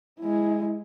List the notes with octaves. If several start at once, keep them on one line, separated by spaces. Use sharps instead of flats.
G#3 E4